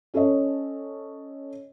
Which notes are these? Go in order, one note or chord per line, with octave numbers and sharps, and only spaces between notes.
C#4 A4 C#5 D#5